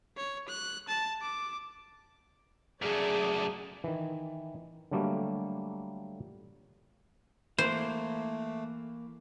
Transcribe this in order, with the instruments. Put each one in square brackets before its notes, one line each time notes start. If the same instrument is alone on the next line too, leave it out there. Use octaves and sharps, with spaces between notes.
[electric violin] C#5
F#6
A5
D6
[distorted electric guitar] F#2 A3 [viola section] G#4 D5
[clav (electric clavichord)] D#3 E3
D3 F#3 G3 A3 A#3
[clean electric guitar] E3 A#3 [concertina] A3 [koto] C5